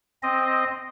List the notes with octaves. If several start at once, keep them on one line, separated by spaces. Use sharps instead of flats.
C4 D#5